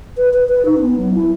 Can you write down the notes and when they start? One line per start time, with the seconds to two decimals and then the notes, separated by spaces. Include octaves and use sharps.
0.17 B4
0.34 B4
0.50 B4
0.65 D#4
0.77 C#4
0.82 B3
0.97 F#3
1.14 E4